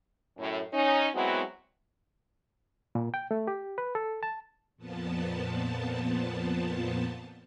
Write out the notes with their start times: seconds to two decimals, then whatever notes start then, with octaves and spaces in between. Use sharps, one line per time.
0.38 F#2 A2
0.73 C#4 D#4
1.14 F#3 G#3 B3 C4 E4 F#4
2.95 A#2
3.14 G5
3.31 A3
3.48 G4
3.78 B4
3.95 A4
4.23 A5
4.77 F2 A#2 F3 B3 A5